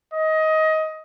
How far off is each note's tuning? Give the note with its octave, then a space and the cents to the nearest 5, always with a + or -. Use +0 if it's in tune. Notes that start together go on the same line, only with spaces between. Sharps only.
D#5 +20